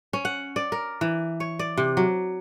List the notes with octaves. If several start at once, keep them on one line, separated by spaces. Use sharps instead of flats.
C#4
F#5
D5
A#4
E3
C#5
D5
C3
F#3